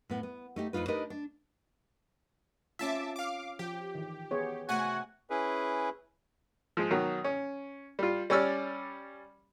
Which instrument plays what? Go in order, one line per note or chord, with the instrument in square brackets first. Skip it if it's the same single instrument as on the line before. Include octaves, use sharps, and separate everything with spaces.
[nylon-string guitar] A2 B3
B3
A3 D#4 G4
F2 D4 D#4 F4 B4
D4 D#4 G4 A#4 B4 D#5
D4
[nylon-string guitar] C4 C#4 F4 [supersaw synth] E5 A5 D6
[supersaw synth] F5 D6
[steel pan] F3 [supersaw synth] G4
[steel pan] D#3 E3
B3 G#4 C#5
[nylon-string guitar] C3 A3 E5 [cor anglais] F#4 [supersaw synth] F#5 G#5
[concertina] C#4 E4 G#4 B4
[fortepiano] F3 G#3
B2 D#3 F#3
C#4
G3 F4
G3 C#4 D5 E6 F6